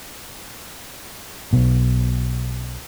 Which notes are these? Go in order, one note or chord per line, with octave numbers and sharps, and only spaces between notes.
B1 B2